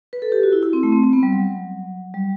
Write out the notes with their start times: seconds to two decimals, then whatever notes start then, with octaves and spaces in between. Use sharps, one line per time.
0.13 B4
0.22 A4
0.32 G4
0.43 F#4
0.52 E4
0.63 E4
0.73 C4
0.83 A3
0.92 C4
1.03 C4
1.13 B3
1.23 G3
1.33 F#3
2.14 G3